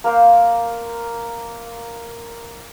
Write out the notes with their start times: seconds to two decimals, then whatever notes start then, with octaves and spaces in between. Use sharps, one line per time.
0.04 A#3 A#4 C5